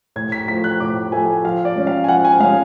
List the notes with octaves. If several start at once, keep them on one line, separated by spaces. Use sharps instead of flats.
A2 G#6
B6
F3 A3 B6
F#6
A2 D6
F3 A3 G#5
F3 F5
D5
G#3 C#4
F5
G#5
F3 F#5
G#5
G#3 C#4 F5